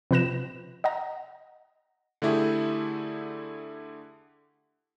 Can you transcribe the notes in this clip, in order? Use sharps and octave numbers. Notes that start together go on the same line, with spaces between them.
C3 F3 B4 F#6 A#6 E7
D#5 F#5 A#5
D3 A3 E4 G4 G#4